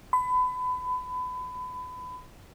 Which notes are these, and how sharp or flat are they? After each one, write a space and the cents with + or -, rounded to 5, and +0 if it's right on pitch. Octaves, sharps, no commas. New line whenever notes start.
B5 +30